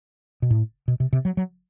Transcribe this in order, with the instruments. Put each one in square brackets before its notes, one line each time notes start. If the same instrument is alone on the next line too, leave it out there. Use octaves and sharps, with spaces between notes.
[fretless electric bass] B2
A2
B2
C3
C3
F#3
F#3